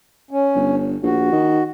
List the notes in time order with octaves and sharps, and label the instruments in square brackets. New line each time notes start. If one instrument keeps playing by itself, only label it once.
[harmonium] C#4
[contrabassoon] G1
[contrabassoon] A#1 [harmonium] F#4
[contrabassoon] D#3